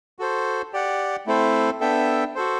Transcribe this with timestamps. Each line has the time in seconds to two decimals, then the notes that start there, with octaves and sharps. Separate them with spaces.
0.19 F#4 A4 C5
0.73 G4 D5 F#5
1.26 A3 C4 E4 A4 C5
1.80 B3 D4 A4 E5 G5
2.35 F#4 A4 C5